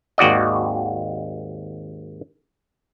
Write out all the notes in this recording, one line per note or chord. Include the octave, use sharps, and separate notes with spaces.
G#1 D#2 F#4 D5 D#5